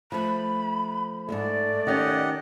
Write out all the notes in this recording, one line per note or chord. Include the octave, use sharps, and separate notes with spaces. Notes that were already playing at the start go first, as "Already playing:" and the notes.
F3 A3 B5
E2 G#2 A3 D5
D#3 C#4 G4 D#5 F#5